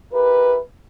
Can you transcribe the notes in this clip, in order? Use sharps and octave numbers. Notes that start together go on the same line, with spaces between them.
E4 G4 A#4 B4